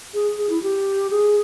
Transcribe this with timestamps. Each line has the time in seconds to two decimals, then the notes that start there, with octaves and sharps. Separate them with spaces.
0.14 G#4
0.38 G#4
0.50 E4
0.62 G4
1.10 G#4